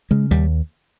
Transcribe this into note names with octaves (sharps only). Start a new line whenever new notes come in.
C#3 G#3
D#2 G3